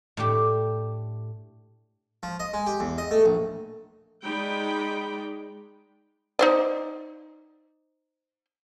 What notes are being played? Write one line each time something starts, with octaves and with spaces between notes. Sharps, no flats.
A2 D4 G4
F3
D#5
G#3
G4
E2
D#5
A3
A#1
G#3 D#4 D5 G5 B5
D#4 C5 D5